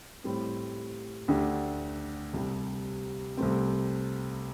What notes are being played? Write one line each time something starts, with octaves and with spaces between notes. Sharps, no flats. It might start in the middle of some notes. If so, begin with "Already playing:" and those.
A2 G3 C4
D2 D3 A3 D4 G4
C2 C3 G3
C2 C3 A3 C4